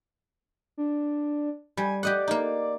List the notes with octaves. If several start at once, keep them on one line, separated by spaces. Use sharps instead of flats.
D4
G3 G#5
G4 D5 D#5 F#5
A#3 D#4